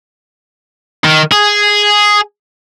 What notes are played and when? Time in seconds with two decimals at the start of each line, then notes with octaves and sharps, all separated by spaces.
1.04 D#3
1.32 G#4